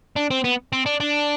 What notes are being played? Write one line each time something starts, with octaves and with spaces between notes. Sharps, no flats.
D4
C4
B3
C4
D4
D4